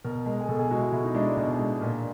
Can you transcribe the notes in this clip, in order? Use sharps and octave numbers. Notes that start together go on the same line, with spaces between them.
B2 A#4
G#3
G#4
B2 A4
G#4
G#3 F#4
E4
B2 E4
D#4
G#3 D4
B2 D4
G#3
A#2